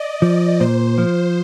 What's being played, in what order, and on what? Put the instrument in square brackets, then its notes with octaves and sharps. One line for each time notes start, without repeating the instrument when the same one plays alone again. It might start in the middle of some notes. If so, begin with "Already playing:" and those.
Already playing: [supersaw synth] D5 D#5
[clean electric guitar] F3 [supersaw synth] D5
[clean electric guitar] A#2 [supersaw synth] C5
[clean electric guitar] F3